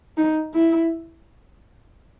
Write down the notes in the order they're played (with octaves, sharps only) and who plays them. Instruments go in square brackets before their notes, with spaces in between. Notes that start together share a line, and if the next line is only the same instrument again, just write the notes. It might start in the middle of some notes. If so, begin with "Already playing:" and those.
[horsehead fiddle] D#4
E4